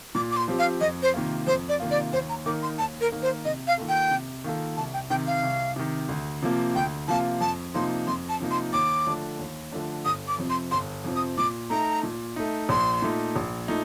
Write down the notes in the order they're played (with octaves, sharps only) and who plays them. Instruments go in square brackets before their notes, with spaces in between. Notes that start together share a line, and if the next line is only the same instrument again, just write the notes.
[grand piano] A#2 [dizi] D6
[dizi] D6
C6
[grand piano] F3 C4 G4
[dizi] F5
[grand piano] F2 [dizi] D#5
[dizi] C5
[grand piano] C3 D#3 A#3 F4
[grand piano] F2 [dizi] C5
[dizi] D5
[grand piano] C3 D#3 A#3 F4
[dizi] D5
[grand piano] D#2 [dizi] C5
[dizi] A#5
[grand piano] D#3 A#3 D#4 A#4 [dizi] D6
[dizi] C6
[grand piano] D#2 [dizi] A5
[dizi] A#4
[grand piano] D#3 A#3 D#4 A#4
[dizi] C5
[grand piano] C3 [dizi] D#5
[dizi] F5
[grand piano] D#3 A#3 F4 A4
[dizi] G5
[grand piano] C3
D#3 A#3 F4 A4
[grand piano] C2 [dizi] A5
[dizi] G5
[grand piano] C3 D#3 [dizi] G5
[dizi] F5
[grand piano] C2
C3 D#3
D2
C3 F3 A#3 F4
[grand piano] D2 [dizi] G5
[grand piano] C3 F3 A#3 F4 [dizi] A5
[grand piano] F2 [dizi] A5
[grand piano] C3 F3 A#3 D#4 [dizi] C6
[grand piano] F2 [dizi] C6
[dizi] A5
[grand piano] C3 F3 A#3 D#4
[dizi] C6
[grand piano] D#2 [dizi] D6
[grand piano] D3 F3 A3 D4
D#2
D3 F3 A3 D4
[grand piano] G1 [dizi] D#6
[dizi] D6
[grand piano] F2 C3 F3 C4
[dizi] C6
[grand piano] G1 [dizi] C6
[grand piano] F2 C3 F3 C4
[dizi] D#6
[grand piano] A#2 [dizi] D6
[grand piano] A3 D#4 [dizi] A#5
[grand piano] A#2
A3 D#4
[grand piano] A#1 [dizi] C6
[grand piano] A#2 A3 D#4
A#1
A#2 A3 D#4